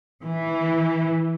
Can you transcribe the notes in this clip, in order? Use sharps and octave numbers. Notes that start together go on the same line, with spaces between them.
E3